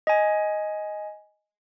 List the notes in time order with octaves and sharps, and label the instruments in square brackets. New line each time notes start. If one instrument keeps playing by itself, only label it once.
[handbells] D#5 G#5